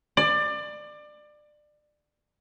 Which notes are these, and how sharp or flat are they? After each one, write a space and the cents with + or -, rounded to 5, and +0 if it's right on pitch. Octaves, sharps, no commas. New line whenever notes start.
D5 +25